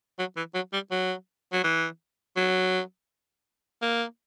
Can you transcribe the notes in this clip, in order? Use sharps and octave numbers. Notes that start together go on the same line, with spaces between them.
F#3
E3
F#3
G3
F#3
F#3
E3
F#3
A#3